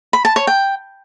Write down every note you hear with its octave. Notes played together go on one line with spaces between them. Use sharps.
B5
A5
C#5
G5